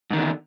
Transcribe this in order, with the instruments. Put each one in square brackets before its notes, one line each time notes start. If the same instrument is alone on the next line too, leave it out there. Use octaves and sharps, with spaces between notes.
[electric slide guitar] G#2
D#3
E2
D3